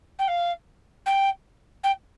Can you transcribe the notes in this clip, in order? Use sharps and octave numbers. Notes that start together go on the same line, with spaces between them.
G5
F5
G5
G5